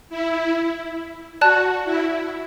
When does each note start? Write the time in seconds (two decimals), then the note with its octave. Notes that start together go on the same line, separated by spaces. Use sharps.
0.10 E4
1.41 F#4 D5 A5 F#6
1.85 E4